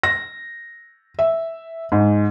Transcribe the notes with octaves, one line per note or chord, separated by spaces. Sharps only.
A#6
E5
G#2